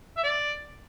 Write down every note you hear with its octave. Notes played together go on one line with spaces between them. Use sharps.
E5
D5